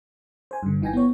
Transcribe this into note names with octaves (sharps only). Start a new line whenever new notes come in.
C5 G#5
G2 D3
G1 E3 D#4 G5 G#5 A#6
B3 C#5